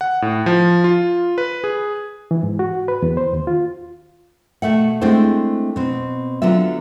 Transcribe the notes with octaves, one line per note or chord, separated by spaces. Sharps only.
F#5
A2
F3
F4
B4
G#4
E3
G#2
F#4
B4
E2
C5
D#2
F4
B2 A3 E5 F#5
G#3 A3 C4 D4 E4 C5
B2 C4
D3 F#3 B3 F4 E5